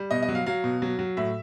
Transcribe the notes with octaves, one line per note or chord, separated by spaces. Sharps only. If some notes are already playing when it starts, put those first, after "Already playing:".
Already playing: G3
B2 D#5
D#5
F#3
F5
F#3 F5
B2
F#3
F#3
A2 E5